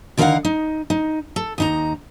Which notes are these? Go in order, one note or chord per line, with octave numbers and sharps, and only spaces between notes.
D3 D#3 A#4 B4 F5 F#5
D#4
D#4
A4
D#2 D#4 A#5